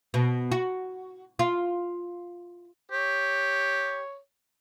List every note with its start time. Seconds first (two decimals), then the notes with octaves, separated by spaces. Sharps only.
0.14 B2
0.52 F#4
1.39 F4
2.91 G4 C#5